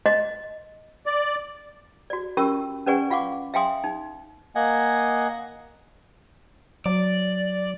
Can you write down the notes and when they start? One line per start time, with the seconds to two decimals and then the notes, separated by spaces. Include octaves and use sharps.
0.06 D#5
1.06 D5
2.10 F#4 D5
2.37 C#4 F4 G4 A#4 C#6 E6
2.87 C#4 B4 D5 F#5 G#5 C#6
3.10 F4 F5 F#5 C#6 D6
3.54 E5 F5 G5 G#5 C6 D#6
3.84 D#4
4.55 A#3 D#5 F#5 G#5
6.86 F#3 D5